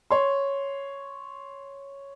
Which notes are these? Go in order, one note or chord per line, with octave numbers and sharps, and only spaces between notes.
C#5 C6